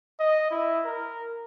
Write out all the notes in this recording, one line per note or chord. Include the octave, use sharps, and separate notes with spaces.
D#5
E4
A#4